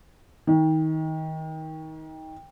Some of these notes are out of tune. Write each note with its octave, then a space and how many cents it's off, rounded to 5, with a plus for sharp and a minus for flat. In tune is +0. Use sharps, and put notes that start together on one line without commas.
D#3 +25